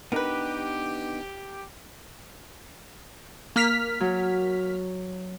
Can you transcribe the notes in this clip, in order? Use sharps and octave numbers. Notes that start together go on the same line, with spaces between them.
B3 D4 D#4 G4 A#4 B4
A#3 F6 B6
F#3